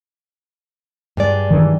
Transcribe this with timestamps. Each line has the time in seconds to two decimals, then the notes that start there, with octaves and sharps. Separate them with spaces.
1.17 G2 G#3 D5
1.51 D#3 E3 D4